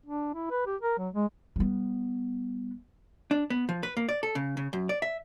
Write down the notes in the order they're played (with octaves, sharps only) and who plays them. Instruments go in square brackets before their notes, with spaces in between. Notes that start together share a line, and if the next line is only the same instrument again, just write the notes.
[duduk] D4
E4
B4
G4
A#4
F#3
G#3
[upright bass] G3 B3
[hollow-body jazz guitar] D4
B3
F3
B4
A#3
D5
A4
C#3
C#3
F#2
D5
E5